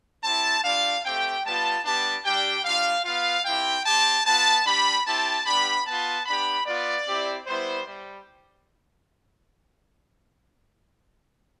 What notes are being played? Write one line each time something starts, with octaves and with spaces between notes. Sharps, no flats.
C4 E4 G4 A5
G3 D4 F4 F5
A3 C4 G4 G5
G3 B3 F4 A5
G3 B3 D4 G4 A5
G3 D4 G4 G5
G3 D4 F4 F5
B3 F4 F5
C4 E4 G4 G5
C4 G4 A5
B3 F4 A5
G3 D4 G4 B5
C4 E4 G4 A5
G3 B3 D4 G4 B5
B3 F4 A5
B3 D4 G4 B5
B3 F4 D5
C4 E4 G4
G3 B3 E4 C5
G3